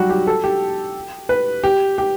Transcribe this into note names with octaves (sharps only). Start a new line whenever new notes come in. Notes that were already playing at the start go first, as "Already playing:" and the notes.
Already playing: F#3 G3 F#4
G4
A4
G4
B4
G4
G4